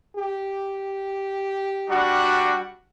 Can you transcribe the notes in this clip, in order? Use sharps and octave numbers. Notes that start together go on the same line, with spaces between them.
G4
G3 D4 F#4